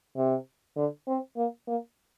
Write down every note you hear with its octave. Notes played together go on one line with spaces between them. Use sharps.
C3
D3
C4
A#3
A#3